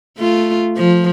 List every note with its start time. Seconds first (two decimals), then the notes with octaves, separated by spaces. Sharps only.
0.18 A3 F4
0.77 F3